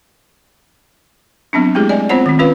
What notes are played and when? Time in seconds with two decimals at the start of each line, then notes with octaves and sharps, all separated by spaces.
1.53 F#3 B3 C4 D4
1.75 G#3 A3 E4 G4 G#4
1.89 D5 D#5 G#5
2.09 B3 C4 F4 C5 C#5 F#5
2.26 D#3 C4
2.39 C#4 F4 B4 F5